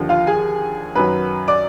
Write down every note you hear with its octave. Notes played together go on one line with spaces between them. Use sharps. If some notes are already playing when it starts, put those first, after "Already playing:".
Already playing: D#2 D3 F3
F4 F5
G#4 G#5
F#2 D#3 F#3 B4 B5
D5 D6